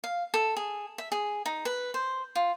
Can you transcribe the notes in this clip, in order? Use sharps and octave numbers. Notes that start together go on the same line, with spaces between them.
F5
A4
G#4
E5
G#4
D#4
B4
C5
F4